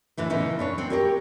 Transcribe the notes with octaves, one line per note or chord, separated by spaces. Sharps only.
A2 D3 E3 A3
A#2 C#3 E3 B3 C#4 D#4
B3 D4 C#5
C4 F#5
G4 A#4 C#5